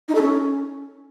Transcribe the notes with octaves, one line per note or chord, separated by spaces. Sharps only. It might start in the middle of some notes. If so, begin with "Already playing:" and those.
D#4
A4
C#4